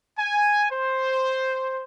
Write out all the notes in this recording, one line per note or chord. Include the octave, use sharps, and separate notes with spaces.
G#5
C5